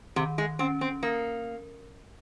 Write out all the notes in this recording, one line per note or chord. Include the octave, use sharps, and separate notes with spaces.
C3 D#3
G#3
C4 C#4
C4
A#3 A#4